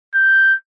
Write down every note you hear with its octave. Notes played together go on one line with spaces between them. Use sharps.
G6